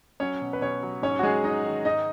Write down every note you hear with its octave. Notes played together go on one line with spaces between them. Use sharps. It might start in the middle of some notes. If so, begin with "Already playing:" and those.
F#3 C#4 C#5
B2
B4
B2 C#4 C#5
F#3
G#2 C#4 C#5
F#4
F#3 G#3 G#4
G#2 D#4 D#5
D#3
G#2 D#4 D#5